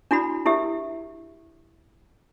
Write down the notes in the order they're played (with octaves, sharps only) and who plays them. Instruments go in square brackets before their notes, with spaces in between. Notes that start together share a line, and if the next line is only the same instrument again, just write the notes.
[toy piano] D4 E4 F#4 B5
E4 G4 A#4 E5